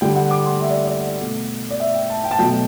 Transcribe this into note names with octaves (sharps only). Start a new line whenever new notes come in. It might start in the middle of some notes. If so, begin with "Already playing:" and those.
D3 G3 G5
F#5
D6
C6
E5
D5
D5
B2 A3
D5
E5
G5
A5
G5
A5
B2 F#3 A3 G5